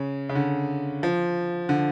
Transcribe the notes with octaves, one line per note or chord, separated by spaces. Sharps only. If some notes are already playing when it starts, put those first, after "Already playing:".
Already playing: C#3
C#3
D3
F3
D3